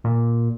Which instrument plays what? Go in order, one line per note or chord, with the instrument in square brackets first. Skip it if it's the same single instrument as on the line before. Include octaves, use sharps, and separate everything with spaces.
[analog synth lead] A#2